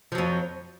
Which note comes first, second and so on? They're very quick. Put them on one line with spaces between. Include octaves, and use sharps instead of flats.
F3 F#3 F2